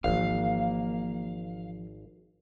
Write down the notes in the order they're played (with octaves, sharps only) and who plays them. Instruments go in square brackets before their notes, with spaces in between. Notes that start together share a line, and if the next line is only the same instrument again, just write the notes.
[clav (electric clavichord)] G#1 [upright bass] E3 F3 [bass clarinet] A#3 [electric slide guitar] F5